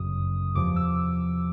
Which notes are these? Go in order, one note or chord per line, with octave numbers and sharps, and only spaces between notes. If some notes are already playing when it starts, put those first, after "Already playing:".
Already playing: G1 F#2 C#3 F#3 D#6
E2 C3 F3 D6
E6